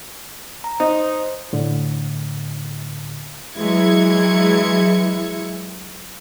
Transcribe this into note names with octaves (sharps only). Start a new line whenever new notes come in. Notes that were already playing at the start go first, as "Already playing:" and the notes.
A#5
D#4 C5
A2 D3
E3 F#3 G#3 E4 G#6 C#7